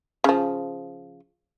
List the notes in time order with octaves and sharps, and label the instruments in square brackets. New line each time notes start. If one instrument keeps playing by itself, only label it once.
[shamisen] C#3 F3